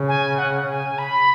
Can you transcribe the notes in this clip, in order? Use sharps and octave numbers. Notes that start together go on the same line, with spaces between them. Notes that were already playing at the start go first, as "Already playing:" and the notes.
Already playing: C#3
G#5
F#5
G#5
B5